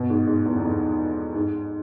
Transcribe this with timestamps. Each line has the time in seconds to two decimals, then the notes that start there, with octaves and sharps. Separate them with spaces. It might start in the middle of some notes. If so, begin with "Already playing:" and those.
Already playing: B2
0.10 G#2
0.27 G#2
0.46 E2
0.57 E2
0.63 F2
1.36 G#2